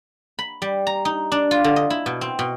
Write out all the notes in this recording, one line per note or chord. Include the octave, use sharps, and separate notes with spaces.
B5
G3
A#5
D#4
D4
F4
D3
D#5
E4
B2
C4
B2